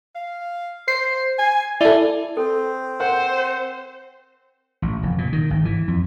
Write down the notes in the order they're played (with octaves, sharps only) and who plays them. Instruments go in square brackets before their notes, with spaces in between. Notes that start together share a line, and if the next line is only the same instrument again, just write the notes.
[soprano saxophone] F5
[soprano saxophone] C5 [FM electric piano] C7
[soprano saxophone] G#5
[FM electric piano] E4 A4 [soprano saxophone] D5
[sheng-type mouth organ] C4 [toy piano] A4
[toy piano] A#4 [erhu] C5 [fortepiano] F#5
[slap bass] A1
F1
A#2
D#3
G#1
E3
F2